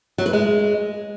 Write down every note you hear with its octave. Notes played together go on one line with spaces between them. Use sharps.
F#3
B4
G#3